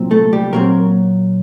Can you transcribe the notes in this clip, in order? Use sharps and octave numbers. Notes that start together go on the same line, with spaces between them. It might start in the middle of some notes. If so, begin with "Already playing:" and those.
Already playing: C2 A#2 F#3 C4
A3 A4
G3 G4
A#2 F#3 A#3 C4 A#4